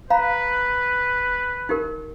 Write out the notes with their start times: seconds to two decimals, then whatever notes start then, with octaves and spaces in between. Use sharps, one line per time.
0.10 B4 F5 A#5 B5
1.69 D#4 G4 A#4